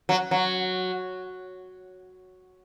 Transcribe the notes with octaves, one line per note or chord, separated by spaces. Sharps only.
F#3
F#3